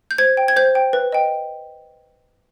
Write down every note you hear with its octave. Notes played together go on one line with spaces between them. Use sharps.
G6
C5 G#6
G5
G#6
C5 G6
G5
B4
D#5 G5